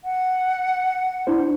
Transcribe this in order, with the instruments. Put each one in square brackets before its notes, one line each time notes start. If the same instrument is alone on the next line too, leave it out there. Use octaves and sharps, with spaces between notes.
[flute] F#5
[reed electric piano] D4 E4 C5